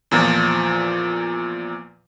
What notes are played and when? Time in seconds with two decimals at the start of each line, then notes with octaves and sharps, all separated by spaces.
0.11 E2 A#2 F3